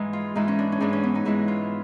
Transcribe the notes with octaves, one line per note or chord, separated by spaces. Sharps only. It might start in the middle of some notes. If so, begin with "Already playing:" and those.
Already playing: G#2 E3 G#3
F4
G#2 E3 G#3 D#4
C#4
D4
C#4
G#2 E3 G#3 D4
C#4
B3
D#4
G#2 E3 G#3 E4
F4